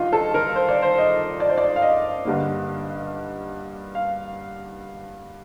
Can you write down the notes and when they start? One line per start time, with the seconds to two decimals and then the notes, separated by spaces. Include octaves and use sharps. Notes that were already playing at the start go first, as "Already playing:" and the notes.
Already playing: G2 D#3 D#4 F4
0.13 A4
0.34 A#4
0.56 C5
0.69 D5
0.82 C5
0.98 D#5
1.40 D5
1.49 C5
1.58 D5
1.76 F5
1.82 D#5
2.25 G2 D3 G3 A#3
3.95 F5